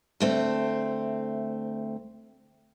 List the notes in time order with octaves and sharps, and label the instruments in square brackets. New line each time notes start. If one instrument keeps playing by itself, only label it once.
[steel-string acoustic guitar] D2 A3 C4